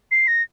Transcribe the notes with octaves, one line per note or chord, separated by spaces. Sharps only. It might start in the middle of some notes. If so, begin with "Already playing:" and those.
C7
A#6